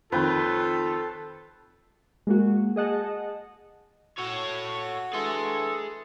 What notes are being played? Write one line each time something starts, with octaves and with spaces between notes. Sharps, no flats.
F2 D#3 F4 A4 B4 G5
G#3 A#3 F#4
G#4 D#5 F#5 A5
F#4 A4 C#5
E3 D4 G#4 A4 C6